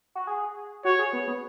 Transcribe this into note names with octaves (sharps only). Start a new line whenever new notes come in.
F#4
G#4
F#4 C#5
G#4
B3
B3